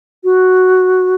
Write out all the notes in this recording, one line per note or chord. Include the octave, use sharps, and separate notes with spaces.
F#4